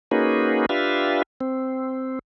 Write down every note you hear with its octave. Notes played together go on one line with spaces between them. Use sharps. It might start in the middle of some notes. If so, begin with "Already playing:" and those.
A#3 C#4 D#4 F#4 G#4 B4
D4 F4 G4 B4 E5 F5
C4